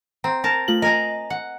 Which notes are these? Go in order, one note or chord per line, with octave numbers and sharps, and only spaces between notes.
C4 A#5
A#4 A5
A3 F4 F#7
A#4 D#5 G#5 A#5
F#5